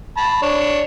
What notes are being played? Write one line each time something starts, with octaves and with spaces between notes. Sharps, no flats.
A5 B5
D4 C#5